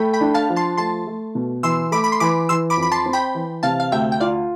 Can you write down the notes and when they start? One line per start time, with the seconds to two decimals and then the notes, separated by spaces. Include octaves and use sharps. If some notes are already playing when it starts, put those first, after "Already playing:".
Already playing: A3 G5 B5
0.13 G5 B5
0.21 D4
0.34 F5 A5
0.50 F3
0.56 A5 C6
0.77 A3 A5 C6
1.07 A3
1.35 B2
1.63 E3 C6 E6
1.92 A3 B5 D6
2.04 B5
2.12 C6
2.20 E3 B5 D6
2.49 E3 C6 E6
2.70 B5 D6
2.77 F2
2.83 B5
2.92 A5 C6
3.06 C4
3.13 G5 B5
3.35 E3
3.63 C3 F5 A5
3.80 F5
3.92 D2 E5 G5
4.12 G5
4.20 F4 D5 F5